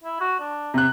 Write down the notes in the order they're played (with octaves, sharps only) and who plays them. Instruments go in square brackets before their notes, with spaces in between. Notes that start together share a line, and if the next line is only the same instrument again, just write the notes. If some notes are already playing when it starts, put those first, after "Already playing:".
[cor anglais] E4
F#4
D4
[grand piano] C3 F#6